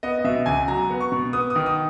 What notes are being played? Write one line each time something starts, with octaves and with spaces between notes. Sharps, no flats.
B3 D#5
D#5
B2 E5
C#2 G#5
F#3 A#5
B3
C#6
B2
B3 D#6
D#6
D#3
D#6